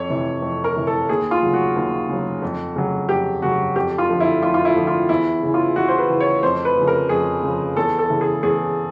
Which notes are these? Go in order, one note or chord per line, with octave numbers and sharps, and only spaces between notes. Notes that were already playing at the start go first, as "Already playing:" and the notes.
Already playing: F2 C#5
C3 E3
F2
A#4
C3 E3
A4
D#2 G#4
F4
C#3 F#3
F#4
D#2
C#3 F#3
F2
C#3 F#3
F2 G4
C#3 F#3 F#4
F2 G4
F4
D3 F3
E4
F2 F4
F4
E4
D3 F3
F4
E2 E4
C#3 E3
F4
E2 F#4
C5
B4
C#3 E3
C#5
F2 C5
B4
C#3 F3
A#4
F2 G#4
C#3 F3
E2 A4
A4
C#3 E3
G#4
E2 G#4